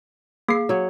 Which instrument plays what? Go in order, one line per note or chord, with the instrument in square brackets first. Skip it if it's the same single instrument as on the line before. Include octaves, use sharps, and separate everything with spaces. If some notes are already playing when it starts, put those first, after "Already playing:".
[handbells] A#3 C7 [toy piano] G#4 F5
[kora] F#3 C#5